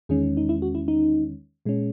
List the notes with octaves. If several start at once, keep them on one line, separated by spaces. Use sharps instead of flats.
E2 D#3 G#3 C#4 G#4
D#4
E4
F#4
E4
D#4
A#2 G#3 C#4